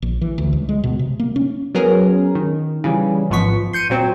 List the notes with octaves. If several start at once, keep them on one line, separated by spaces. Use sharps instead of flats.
A#1
E3
D2
C#2
G#3
B2
C3
A#3
C#4
F#3 B3 C#4 G#4 A#4
D#3
C#3 E3 G3 C#4
G#1 G#2 F3 B3 C#6 B6
C6 G6 C#7 D#7
A#2 F#3 C4